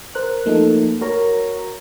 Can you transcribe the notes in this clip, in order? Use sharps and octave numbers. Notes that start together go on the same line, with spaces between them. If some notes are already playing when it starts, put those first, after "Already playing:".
A#4 C5 F#6
F3 A3 A#3 D#4 A4
F#4 A#4 C#5 A#5